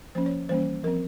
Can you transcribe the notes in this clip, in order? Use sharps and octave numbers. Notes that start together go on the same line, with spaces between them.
F3 A#3 C#4 C5
C#5
E3 G3 A#3 C#4 C5
F3 C4 A#4